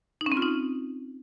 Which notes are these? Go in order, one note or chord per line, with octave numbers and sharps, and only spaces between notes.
D#4
C#4
C4
F4
D#4